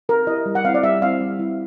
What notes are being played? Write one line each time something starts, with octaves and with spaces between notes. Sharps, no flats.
C4 A#4
E4 G4 D#5
G3
F#5
C4 E4 F5
D5
G3 E5
C4 E4 F5
G3
C4 E4